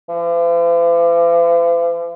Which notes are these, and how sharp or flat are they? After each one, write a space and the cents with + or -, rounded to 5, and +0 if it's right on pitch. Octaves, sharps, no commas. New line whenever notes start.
F3 -45